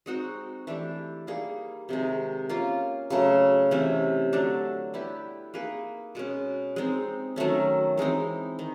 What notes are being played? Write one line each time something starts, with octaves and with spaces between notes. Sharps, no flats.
G#3 C4 D#4 F#4
E3 A3 D4 G4
G3 A#3 D#4 G#4
C3 D#3 G#3
A#3 C#4 F4
C#3 F#3 A3
C3 E3 A3 C#4
D3 F#3 A3 D4
G3 B3 E4 G4
A#3 D#4 G#4 B4
B2 G#3 C#4
G#3 C4 D#4
D#3 F#3 A3 C#4
E3 G#3 C4 D#4
D#3